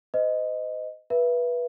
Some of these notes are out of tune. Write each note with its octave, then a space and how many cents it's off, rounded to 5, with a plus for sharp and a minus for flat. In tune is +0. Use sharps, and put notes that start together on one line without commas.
C5 -40 D#5 +0
B4 -15 E5 +25